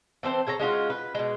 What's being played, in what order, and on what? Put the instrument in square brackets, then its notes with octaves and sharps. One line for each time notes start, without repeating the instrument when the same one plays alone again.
[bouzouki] E3 C4 A4 C5
G#4 A4 C#5 A#5
G#3 C#4 F4 F#4
B4
B2 G#3